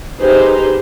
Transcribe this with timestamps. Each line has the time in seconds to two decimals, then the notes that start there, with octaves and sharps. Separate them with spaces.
0.19 D#4 G4 G#4 B4 C5